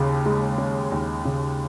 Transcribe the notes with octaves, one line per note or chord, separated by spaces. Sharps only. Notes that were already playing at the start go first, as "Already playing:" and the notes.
Already playing: D#2 C#3
G#3
C#4
D#2
C#3